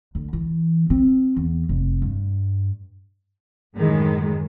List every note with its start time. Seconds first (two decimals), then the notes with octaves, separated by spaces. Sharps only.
0.15 D2
0.33 E3
0.90 C4
1.36 E2
1.69 F1
2.02 G2
3.76 F#2 A2 D#3 G#3